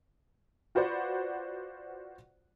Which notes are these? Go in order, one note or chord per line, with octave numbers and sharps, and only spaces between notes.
F4 F#4 B4 C5 D5 F#5